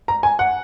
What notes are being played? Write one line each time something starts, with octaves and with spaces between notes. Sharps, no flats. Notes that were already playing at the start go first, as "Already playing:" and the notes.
A#5
G#5
F#5